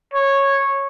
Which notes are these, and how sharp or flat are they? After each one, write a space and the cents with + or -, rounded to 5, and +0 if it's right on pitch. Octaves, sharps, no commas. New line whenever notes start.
C#5 -10